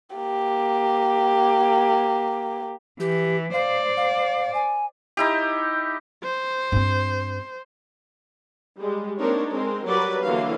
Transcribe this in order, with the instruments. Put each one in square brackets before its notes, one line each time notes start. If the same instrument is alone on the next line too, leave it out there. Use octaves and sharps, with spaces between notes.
[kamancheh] A#3 G4
[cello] E3 [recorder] G4
[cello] C5 D5 [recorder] F5
[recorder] F5
G#5
[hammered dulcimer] D#4 E4 G4
[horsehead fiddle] C5
[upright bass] G2 C4
[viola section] G3 G#3
A#3 C4 D4 D#4 A#4 C#5
G#3 C4 A#4
F#3 G3 F#4 A#4 B4 D5
D3 E3 F#3 A#3 D4 F5